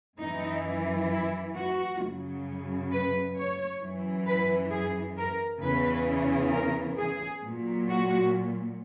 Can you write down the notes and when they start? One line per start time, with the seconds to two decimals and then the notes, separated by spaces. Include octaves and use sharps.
0.20 F#2 E3 D#4
1.10 E4
1.55 F#4
2.01 F#2 C#3 F#3
2.91 B4
3.36 C#5
3.81 F#2 E3
4.27 B4
4.71 G#4
5.17 A#4
5.62 E2 C#3 E3 B4
6.52 A#4
6.97 G#4
7.43 A#2 F#3
7.88 F#4